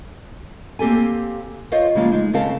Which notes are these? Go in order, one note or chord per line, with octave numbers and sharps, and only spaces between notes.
A#3 C4 G4 A4 G#5
F4 C5 C#5 D#5 F5
C#3 F3 G3 G#3 A#3 F4
G#3 D#4
C#3 C4 G#4 A#4 F5 A5